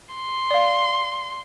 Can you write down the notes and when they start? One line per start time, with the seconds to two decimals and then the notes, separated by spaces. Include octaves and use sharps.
0.15 C6
0.51 D5 F5